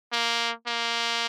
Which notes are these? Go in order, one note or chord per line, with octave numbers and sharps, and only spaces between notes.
A#3
A#3